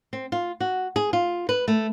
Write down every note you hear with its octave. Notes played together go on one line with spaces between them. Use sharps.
C4
F4
F#4
G#4
F4
B4
A3